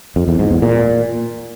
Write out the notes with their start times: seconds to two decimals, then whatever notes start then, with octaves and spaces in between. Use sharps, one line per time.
0.16 F2
0.28 E2
0.39 G#2
0.51 E2
0.62 A#2